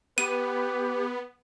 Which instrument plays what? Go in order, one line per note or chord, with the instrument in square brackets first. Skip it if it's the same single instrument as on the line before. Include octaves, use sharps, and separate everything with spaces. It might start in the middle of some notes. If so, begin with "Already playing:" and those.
[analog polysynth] B3 [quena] G4 [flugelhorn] B4 [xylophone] D#7